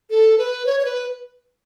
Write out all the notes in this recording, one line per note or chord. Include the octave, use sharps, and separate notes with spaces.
A4
B4
C#5
C#5
B4